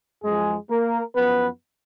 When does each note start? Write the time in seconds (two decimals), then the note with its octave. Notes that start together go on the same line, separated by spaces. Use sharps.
0.24 F#2 F3 G#3 G#4
0.70 A#3 A#4
1.16 F#2 F3 B3 B4